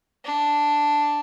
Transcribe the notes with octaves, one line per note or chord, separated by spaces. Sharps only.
D4